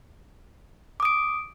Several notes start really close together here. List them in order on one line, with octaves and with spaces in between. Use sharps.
D6 D#6 D7